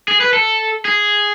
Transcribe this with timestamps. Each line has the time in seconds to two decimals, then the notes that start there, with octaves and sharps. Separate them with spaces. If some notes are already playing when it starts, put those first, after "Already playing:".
0.08 G#4
0.20 B4
0.33 A4
0.85 G#4